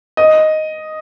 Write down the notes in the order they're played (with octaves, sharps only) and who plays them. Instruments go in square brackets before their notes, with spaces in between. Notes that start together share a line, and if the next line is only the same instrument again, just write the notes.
[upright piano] D#5